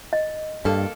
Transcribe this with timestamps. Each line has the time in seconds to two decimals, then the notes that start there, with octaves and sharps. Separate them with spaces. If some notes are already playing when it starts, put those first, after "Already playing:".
0.13 D#5
0.65 G2 A#3 A4